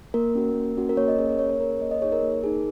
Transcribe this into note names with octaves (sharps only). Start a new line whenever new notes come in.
A#3 A#4
C#4 F#4
A#3
C#4 F#4
A#4
A#3 C#5
D#5
C#4 G#4 C#5
A#4
A#3 C#5
C#5
C#4 G#4 A#4
C#5
A#3 D#5
D#5
D#4 G#4 C#5
A#4
A#3
D#4 G#4